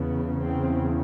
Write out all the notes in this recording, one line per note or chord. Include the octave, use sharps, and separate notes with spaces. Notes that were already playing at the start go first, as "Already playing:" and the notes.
Already playing: E2 C#3 B3
C4